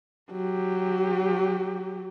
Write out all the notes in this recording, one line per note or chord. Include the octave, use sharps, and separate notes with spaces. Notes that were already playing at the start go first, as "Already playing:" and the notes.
F#3 G4